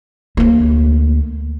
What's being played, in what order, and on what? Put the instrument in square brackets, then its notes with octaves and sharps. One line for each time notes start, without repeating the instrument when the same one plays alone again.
[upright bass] D2 A#3